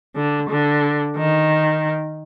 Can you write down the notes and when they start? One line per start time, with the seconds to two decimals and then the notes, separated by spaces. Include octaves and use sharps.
0.15 D3
0.49 D3
1.17 D#3